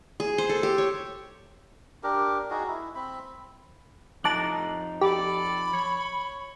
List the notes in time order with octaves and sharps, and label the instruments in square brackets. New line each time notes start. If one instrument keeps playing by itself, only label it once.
[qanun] G#4
C5
A4
G4
C#5
[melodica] D4 G4 A#4
D#4 F#4 G#4
E4
C4 B5
[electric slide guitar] F2 D#4 A#5 [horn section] A2 [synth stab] A5 D6 F#6
[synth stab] G4 [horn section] A4 D5 [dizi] B5
[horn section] C#5